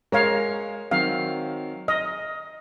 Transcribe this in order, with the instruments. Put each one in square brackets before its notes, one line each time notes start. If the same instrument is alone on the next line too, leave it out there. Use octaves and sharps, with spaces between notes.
[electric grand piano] G#3 [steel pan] A#4 C#5 F5
[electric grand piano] D#3 F#3 C4 [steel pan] F5
[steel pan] D#5 [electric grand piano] F6